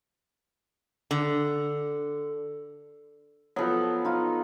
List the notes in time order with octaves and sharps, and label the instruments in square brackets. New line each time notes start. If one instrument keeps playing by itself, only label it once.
[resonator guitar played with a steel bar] D3
[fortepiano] F3 F#3 [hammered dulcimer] B3 A4
[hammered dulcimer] D#4 F4